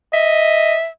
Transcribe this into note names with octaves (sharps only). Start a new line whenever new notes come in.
D#5 E5